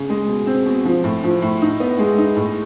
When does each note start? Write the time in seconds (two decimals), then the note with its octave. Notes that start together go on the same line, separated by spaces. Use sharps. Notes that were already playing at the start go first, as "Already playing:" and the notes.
Already playing: C#3
0.10 G#3
0.28 B2
0.47 C4
0.66 B2
0.85 F3
1.04 A2
1.23 F3
1.42 A2
1.62 D#4
1.80 B3
1.99 G#3
2.18 D#4
2.37 A2